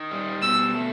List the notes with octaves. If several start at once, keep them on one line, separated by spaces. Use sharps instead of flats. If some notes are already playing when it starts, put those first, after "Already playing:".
Already playing: D#3
G3
B2 E6
A3